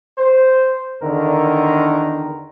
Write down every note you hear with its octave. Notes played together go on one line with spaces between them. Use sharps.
C5
E2 D3 D#3 A#4